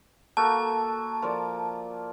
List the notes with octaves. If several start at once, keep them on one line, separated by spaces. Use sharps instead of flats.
A#3 F#4 A4 A5
F3 A#4 D5